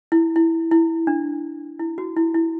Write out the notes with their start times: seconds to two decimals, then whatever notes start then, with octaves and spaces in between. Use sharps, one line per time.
0.12 E4
0.36 E4
0.71 E4
1.07 D4
1.79 E4
1.98 F#4
2.16 E4
2.35 E4